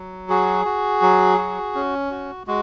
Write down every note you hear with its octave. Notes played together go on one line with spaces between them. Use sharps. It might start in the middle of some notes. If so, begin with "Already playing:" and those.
Already playing: F#3
F#4 G#4
F#4
F#3
F#4
C#4
F#4
G#3 F#4